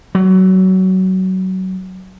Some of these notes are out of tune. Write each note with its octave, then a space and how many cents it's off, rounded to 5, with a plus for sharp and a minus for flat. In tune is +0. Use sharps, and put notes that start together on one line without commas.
F#3 +20